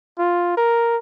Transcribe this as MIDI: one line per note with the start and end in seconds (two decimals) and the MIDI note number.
0.18 0.55 65
0.57 0.97 70